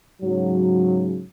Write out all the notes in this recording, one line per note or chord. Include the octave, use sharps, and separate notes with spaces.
G#2 C#3 F#3